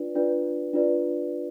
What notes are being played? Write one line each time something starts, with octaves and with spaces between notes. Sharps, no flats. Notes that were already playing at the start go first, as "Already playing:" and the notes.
Already playing: D4 F4 B4 D5
D4 F4 B4 D5
D4 F4 B4 D5